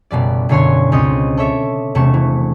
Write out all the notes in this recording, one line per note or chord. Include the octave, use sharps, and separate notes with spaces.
F#1 B2 G3 D5
F#1 B2 D3 C#5 G#5 C6
C#2 C4 C#5 D#5 D#6 G6
A4 C#5 E5 D6
E1 C3 A3 C#6 E7
E3